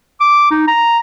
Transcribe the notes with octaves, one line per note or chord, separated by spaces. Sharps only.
D6
D#4
A#5